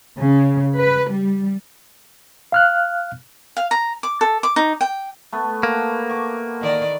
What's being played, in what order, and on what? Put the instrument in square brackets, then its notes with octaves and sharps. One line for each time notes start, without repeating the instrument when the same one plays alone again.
[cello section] C#3
B4
G3
[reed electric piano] F5 F6 F#6
[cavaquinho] F5
A#5
D6
A4
D6
D#4
G5
[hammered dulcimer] A3 B3
[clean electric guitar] A#3
[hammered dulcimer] C#6 D6
[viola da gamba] D#3 D5